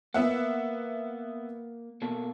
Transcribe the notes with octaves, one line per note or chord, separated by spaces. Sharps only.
A#3 B3 E5 F#5
B2 A#3 A4